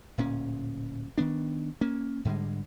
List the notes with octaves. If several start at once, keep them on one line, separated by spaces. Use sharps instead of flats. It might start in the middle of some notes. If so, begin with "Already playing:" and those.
D1 A#2 C#4
D#3 B3 D4
A#3 C#4
G#2 D3 G3 G#3